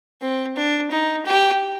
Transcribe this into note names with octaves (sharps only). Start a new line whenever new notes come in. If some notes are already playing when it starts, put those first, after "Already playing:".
C4
D4
D#4
G4